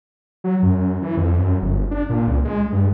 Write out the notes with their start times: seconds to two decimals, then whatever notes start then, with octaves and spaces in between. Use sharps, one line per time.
0.44 F#3
0.63 F#2
0.77 F#2
1.02 E3
1.17 F2
1.38 F#2
1.62 G1
1.91 D4
2.09 A#2
2.27 C#2
2.45 G#3
2.72 G2